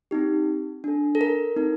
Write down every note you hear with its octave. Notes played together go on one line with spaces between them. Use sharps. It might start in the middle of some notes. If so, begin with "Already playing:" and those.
C4 D#4 G4
D4 A4
A4
A#4
C4 D#4 A4